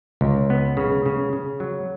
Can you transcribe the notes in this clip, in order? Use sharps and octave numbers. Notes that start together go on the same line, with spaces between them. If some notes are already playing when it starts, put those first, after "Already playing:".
C#2
B3
C#3
C#3
C#3
F#3